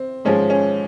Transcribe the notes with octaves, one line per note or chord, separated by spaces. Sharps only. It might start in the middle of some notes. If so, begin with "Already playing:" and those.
Already playing: C4
G#2 F3 G#3 C#4
C#4